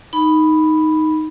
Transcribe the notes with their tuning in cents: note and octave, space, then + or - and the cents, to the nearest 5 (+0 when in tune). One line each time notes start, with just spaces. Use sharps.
D#4 +0 B5 +0